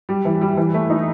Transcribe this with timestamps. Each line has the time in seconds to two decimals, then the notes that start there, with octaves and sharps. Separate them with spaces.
0.09 G3
0.25 E3
0.41 G3
0.57 E3
0.74 A3
0.90 D#4